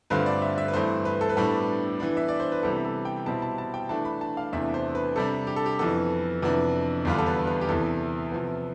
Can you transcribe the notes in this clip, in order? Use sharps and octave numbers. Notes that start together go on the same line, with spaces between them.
G2 D3 A3 C4 F4 B4
D5
E5
E5
B4
G2 E3 A3 C4 C5
B4
A4
B4
A2 G3 B3 D4 A4
E3 B3 D4
E5
D5
C5
B4
C3 E3 G3 B3 A4
A4
G5
B2 G3 C4 E4 A5
A5
A5
G5
E3 A3 D4 A5
B5
A5
F5
E2 C3 E3 A3 D4 E5
C5
B4
C3 G3 D4 A4
G4
A4
G4
F2 E3 B3 A4
F2 C3 E3 B3 D4
E2 D3 G3 D4 F4
A4
B4
B4
G4
E2 C3 E3 A4
C3 F3 B3